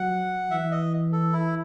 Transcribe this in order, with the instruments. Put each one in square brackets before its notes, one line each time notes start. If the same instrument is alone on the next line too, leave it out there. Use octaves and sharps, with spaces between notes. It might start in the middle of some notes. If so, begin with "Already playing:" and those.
Already playing: [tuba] F#3 [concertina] F#5
[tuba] E3 [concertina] E5
[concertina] D#5
A4
E4